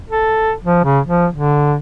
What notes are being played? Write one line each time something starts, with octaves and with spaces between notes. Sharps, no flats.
A4
F3
C#3
F3
D3